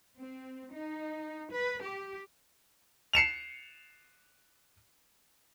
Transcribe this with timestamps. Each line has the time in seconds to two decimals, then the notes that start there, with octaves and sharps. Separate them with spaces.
0.21 C4
0.73 D#4
1.51 B4
1.83 G4
3.13 C7 C#7 E7 F7